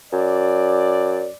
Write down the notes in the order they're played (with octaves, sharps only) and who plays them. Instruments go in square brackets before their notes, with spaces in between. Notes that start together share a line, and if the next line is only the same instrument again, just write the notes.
[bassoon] F#2 [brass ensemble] D5